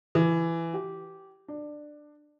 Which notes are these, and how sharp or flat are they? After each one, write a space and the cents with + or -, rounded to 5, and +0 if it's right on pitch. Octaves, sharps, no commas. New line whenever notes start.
E3 +15
G4 -15
D4 +15